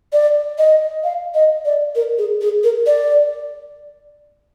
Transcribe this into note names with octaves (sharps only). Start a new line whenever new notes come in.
D5
D#5
F5
D#5
D5
A#4
G#4
G#4
A#4
D5